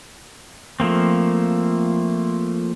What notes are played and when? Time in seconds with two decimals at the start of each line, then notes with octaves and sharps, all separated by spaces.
0.80 F3 A3 A#3 C4